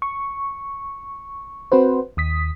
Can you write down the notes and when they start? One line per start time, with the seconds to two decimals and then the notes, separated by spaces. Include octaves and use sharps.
0.02 C#6
1.72 C4 F#4 B4 C5
2.17 D#2 D#6 B6